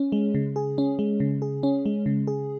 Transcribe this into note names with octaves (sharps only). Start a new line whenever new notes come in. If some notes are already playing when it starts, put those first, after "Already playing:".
Already playing: C#4
G#3
C#3
G#4
C#4
G#3
C#3
G#4
C#4
G#3
C#3
G#4